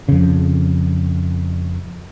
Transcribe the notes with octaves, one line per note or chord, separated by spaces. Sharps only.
F2 C#3